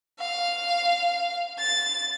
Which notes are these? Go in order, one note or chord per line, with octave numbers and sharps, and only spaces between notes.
F5
A6